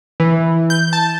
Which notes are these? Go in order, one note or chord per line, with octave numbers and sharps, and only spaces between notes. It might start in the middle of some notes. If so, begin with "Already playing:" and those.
E3
G6
A5